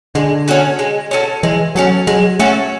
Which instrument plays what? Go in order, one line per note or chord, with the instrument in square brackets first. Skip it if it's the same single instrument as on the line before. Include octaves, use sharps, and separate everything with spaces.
[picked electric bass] D3 [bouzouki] G#3
[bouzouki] C#4 F#4 A4
G#3
C#4 F#4 A4
[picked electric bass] E3 [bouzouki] G#3
[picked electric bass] F#3 [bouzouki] C#4 F#4 A4
[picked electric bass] F#3 [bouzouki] G#3
[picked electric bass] A3 [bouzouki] C#4 F#4 A4